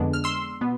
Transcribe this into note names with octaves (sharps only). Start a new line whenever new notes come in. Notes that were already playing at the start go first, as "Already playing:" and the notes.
Already playing: F2 D3 G#3 B3 D4
F6
C6 E6
B2 B3